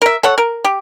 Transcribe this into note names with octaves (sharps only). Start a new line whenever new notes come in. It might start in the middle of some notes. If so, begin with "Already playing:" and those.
A#4 E5
A4 C#5 F#5
A#4
G4